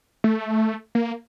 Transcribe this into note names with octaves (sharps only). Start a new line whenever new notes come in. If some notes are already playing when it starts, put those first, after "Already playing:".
A3
A#3